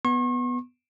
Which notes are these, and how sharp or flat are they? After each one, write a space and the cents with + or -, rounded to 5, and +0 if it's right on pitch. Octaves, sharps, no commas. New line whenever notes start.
B3 +0 C#6 -45